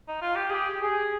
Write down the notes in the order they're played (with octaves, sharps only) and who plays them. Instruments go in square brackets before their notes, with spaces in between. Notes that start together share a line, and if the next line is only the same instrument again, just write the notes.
[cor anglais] D#4
F4
G4
[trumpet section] G4 [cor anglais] G#4
[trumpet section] G#4